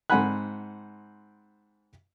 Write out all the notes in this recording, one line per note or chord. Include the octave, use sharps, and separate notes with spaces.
G#2 C4 F#5 G#5 B5 F#6